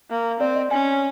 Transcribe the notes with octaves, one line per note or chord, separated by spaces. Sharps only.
A#3
C4 D5
D#5
C#4 G#5